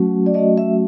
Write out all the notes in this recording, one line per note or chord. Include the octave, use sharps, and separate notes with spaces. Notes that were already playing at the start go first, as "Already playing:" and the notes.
Already playing: F#3 A3 C#4 F#4
D5
F#3 A3 C#4 F#4 D#5
E5